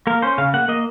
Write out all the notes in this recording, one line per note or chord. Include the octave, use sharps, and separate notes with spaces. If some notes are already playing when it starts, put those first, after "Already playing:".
A#3 A#4
C#4 C5
C#3 F5
A#3 F#5
A#3 D#5